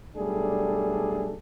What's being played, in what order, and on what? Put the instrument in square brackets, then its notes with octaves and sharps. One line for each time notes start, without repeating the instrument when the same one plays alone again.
[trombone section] B1 G3 A3 D4 G#4 A4